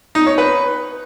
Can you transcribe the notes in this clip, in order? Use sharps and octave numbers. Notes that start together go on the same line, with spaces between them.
D#4
C#5
B4